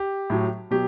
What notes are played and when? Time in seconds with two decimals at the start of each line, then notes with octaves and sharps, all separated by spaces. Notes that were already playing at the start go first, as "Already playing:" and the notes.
Already playing: G4
0.30 A2 F#3
0.71 B2 F#3 G4